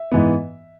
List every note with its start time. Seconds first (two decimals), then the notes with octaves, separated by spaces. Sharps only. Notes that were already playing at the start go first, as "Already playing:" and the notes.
Already playing: E5
0.12 G#2 E3 B3